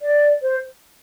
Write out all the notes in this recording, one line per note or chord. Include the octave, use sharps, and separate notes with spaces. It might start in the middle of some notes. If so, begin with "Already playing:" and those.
D5
C5